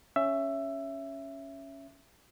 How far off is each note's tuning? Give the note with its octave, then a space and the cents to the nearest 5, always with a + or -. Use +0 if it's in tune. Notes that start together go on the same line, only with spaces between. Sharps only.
C#4 +0 E5 +15